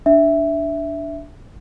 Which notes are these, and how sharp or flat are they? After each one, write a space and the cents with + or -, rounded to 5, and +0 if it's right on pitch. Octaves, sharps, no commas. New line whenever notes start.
D4 +0 E5 +0